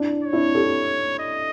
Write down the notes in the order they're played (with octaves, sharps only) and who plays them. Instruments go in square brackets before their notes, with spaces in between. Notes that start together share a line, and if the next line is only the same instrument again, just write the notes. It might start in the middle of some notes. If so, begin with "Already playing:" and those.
Already playing: [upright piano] D4 E4
[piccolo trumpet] C#5
[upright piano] D4 E4
G4 A4
[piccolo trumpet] D#5